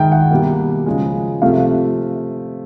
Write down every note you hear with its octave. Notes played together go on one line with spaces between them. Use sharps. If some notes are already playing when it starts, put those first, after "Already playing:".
Already playing: D#3 G#3 G5
F#5
B2 G3 A#3
C#3 F3 G#3
C3 F3 A3 F5